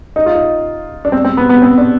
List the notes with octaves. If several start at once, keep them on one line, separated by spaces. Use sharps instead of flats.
D#4
F4
D#4
D4
C4
C4
B3
B3
C4
D4